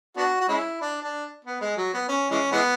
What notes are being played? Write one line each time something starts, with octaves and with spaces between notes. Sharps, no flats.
B3 D4 F#4
F#4
G#3 C#4 E4
D4
D4
B3
G#3
F#3
B3
C#4
E3 G#3 C#4
E3 G#3 B3